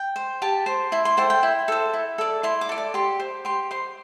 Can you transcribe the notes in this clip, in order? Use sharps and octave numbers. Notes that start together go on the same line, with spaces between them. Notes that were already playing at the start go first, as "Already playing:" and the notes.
Already playing: G5
C5
G4 A5
C5
E4 C6
C6
A4 C5 G5
G5
E4
A4 C5
E4
A4 D5
E4 C6
D6
A4 D5
D6
G4 C6
C5
G4 C6
C5 C6